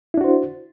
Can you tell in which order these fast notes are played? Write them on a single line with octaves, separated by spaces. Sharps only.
E4 D4 F#4 C5